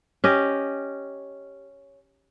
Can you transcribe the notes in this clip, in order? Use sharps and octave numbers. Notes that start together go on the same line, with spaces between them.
C#4 G4 D#5